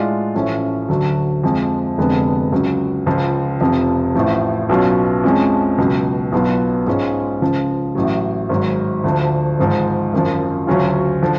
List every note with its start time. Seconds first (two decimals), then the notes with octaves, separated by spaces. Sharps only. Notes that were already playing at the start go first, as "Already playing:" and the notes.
Already playing: A2 G#3 D4 F4
0.35 A1 A2 F3 A3 C#4
0.89 D2 D3 F#3
1.43 F2 F3 G#3
1.98 F1 F2 D3 G#3 B3
2.52 C#2 C#3 F#3
3.06 C#2 C#3 F3
3.61 F1 F2 F3
4.15 A1 A2 F3
4.69 B1 B2 F#3 C#4 F4
5.24 F2 F3 G#3 C#4
5.78 C#2 B2 F#3
6.32 B1 B2 F#3 B3 F4
6.86 G#2 G#3 C#4 F4
7.41 C#2 C#3 F3
7.95 A1 A2 F#3
8.49 G#1 G#2 F#3
9.04 D2 D3 F3
9.59 G#1 G#2 F3
10.14 G#1 F#2 F3
10.67 D2 C#3 F#3 C#4 F4
11.22 D3 F3